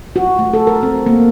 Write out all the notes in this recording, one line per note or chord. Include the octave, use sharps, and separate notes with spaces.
F#4
A3
A4
A#4
C4
A#3